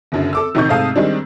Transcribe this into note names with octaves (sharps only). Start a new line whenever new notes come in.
F#1 F#2 D3
A4 D6 E6
A#1 C3 D#3 D#4 C#6 G6
G#2 C3 A3 F5 A5 D#6
D#3 G3 G#3 C4 D4